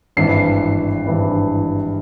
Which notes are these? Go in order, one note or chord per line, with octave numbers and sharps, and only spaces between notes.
G#1 G2 E3 C7
G#1 G2 E3